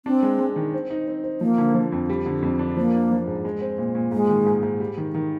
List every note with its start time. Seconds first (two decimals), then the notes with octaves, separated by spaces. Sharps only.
0.06 C4 D4
0.23 G#3
0.39 G#3
0.56 D#3
0.74 C4
0.90 D#4
1.08 C4
1.24 C4
1.41 F3 A#3
1.58 D3
1.75 F3
1.92 F2
2.10 G3
2.26 D3
2.42 F2
2.59 D4
2.77 F3 A#3
2.94 D4
3.11 F3
3.27 G#2
3.45 G#3
3.61 C4
3.78 A#2
3.95 A#2
4.12 G#2 G#3
4.30 D#3
4.46 G#2
4.63 G#2
4.80 G3
4.97 D#3
5.15 D#3